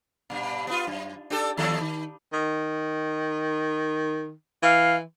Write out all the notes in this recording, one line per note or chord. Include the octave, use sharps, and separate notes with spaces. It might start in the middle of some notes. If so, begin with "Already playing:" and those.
G2 A#2
B3 D4 F4
F#2
D4 G4 A4
D#2 F3 A4
D#3
D#3
E3 F5